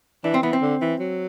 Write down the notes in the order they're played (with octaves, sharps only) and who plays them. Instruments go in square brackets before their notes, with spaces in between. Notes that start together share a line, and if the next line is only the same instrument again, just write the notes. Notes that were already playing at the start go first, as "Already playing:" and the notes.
[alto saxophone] E3 [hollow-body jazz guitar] D4
[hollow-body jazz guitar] C4
[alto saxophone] E3 [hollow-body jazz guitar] B3
[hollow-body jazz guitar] C4
[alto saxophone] D3
E3
F#3